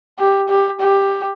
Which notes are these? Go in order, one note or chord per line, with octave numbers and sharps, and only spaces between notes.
G4
G4
G4